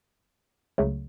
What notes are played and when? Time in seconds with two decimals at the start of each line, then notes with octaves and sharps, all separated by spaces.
0.78 C#2 C#3 F#3 A3